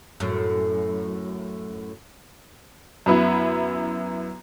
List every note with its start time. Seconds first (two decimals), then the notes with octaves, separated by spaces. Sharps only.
0.20 F#2 A2
3.06 F#2 B3 E4